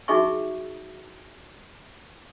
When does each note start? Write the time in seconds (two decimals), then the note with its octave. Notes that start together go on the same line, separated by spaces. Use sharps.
0.08 D#4 F#4 G#4 E5 G#5 C#6